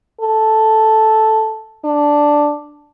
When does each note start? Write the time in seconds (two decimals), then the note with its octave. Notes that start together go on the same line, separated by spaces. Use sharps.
0.21 A4
1.85 D4